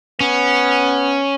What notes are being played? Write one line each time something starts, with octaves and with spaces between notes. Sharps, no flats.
B3 C#4